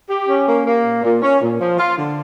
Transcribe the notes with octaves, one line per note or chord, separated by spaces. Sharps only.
G4
C#4
A#3
A#3
A#2
A#2
C#4
A#2
F3
F4
D3